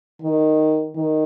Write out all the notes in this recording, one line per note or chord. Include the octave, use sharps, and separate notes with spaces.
D#3
D#3